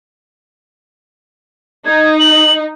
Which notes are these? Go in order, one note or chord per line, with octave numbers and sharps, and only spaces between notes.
D#4 G#6
F#7